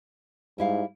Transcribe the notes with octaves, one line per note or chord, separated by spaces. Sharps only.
G#2 G3 E4 F5